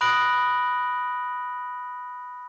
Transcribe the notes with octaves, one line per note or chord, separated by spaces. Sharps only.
B5 D#6 F#6 A#6 D7 F#7